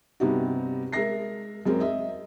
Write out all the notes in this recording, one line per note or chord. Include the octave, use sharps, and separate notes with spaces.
G2 C3 B3 D#4 F#4
G#3 A#4 E5 A#6 C7
F#2 G#3 C4 A#4
D#5 E5